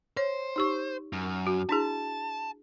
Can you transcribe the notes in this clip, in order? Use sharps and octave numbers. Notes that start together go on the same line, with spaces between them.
C5 C#5
D#4 G4 C#6
F#2
F#4
D4 E4 G#4 A5